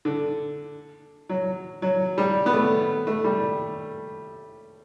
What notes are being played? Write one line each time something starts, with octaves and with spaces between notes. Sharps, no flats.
D3
F#3
F#3
G3
B3
A3
A3
G3